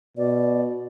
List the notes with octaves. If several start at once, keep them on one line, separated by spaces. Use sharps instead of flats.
B2 D5